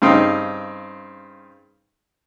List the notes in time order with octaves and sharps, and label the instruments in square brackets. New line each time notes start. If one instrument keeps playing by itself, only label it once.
[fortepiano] G2 C#3 C4 D#4